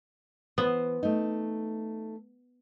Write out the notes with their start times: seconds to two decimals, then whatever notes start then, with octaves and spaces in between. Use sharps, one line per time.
0.58 E3 B3 C5
1.03 A3 D#4